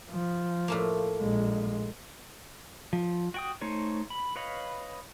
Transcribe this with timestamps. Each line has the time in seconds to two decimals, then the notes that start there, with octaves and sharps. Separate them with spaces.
0.10 F3
0.68 A2 A3 A#3
1.19 A#1 G#3
2.93 F3
3.34 F#4 G5 D#6
3.61 A3 D#4 C5 C#5
4.10 B5
4.36 B4 C#5 D#5 F5 B5